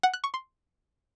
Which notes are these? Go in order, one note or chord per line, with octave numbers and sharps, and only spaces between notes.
F#5
F#6
C#6
C6